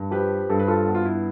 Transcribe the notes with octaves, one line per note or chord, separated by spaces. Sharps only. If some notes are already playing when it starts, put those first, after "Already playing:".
Already playing: G2
F3 G4 B4
G2 A4
B4
F4 A4
B3
F4
E4